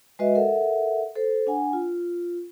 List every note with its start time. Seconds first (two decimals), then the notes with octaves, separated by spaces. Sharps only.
0.19 G#3 F#4 B4 D#5 E5
0.35 A4 A#4 E5 F#5
1.16 A4 C5
1.47 D4 F#5 G#5
1.73 F4